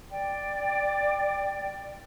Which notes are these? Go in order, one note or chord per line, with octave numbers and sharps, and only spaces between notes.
D5 G5